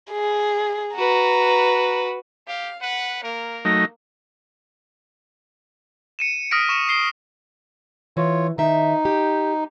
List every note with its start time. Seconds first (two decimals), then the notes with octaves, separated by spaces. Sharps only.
0.12 G#4
0.95 F#4 B4 A#5
2.48 G4 F5
2.82 B4 F#5
3.24 A#3 A#4
3.65 F#3 A3 D#4 A#6
6.19 C#7 D#7 E7
6.51 D#6 F6 A#6 B6 C#7 D7
6.69 C#6 D7 E7
6.89 C7 G7
8.17 E3 F4 C#5
8.58 D#3 D#4 E5
9.05 G4